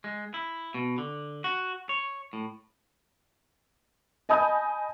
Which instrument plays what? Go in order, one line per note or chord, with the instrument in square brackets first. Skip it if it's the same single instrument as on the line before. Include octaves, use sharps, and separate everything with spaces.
[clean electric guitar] G#3
E4
B2
D3
F#4
C#5
A2
[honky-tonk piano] D#5 G#5 A5 B5 D#6 G6